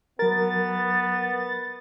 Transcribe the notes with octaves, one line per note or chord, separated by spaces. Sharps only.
F#3 B3 A#4 A6